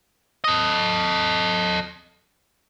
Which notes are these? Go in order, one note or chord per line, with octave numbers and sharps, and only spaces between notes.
A4 D#5